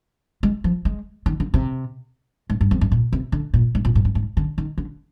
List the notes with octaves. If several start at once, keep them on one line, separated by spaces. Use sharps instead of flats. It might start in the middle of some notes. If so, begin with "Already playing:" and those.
G#3
F3
G#3
D#3
D3
C3
G#2
G2
F2
G2
A#2
C3
D3
A#2
G#2
A#2
G#2
G2
G#2
D3
D#3
D3